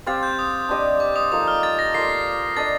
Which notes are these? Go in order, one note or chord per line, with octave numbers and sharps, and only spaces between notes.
C4 G4 C5 F5 A6
G6
D#6
D4 G4 C5 D#5
D6
D#6
F3 A#3 D#4 A4 D#6
F6
A6
A#6
A#3 F4 A4 D5 C7
C7
D4 A4 D#5 A6